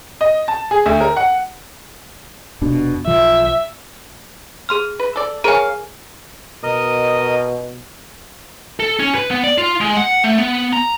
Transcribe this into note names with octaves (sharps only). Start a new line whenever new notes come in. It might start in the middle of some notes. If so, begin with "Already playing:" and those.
D#5
A5
G#4
D2
A#4
F#5
F1 B2 D4
B1 F3 E5
G#4 C6 F6
B4
A4 D5
G#4 A#4 C#5 F5 G#5
B2 A#4 D#5 D#6
A4
C#4
B4
B3
D5
F4
G#3
F#5
A3
B3
A#5